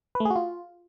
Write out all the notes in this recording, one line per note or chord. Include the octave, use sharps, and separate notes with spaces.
B4
A3
G#4
F#4
F4